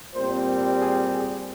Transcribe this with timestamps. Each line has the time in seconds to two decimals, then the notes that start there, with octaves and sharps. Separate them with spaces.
0.14 A#2 G3 C4 C5
0.79 G#4
1.11 G#4